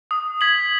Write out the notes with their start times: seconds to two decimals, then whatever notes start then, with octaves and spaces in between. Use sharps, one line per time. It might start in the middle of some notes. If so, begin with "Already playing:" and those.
0.11 D#6
0.41 G#6 B6 F#7